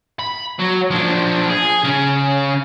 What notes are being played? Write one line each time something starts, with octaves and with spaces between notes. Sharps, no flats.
B5
F#3
F3 D4
G#4
C#3 C#4